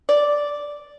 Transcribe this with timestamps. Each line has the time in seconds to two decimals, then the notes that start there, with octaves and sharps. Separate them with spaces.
0.09 D5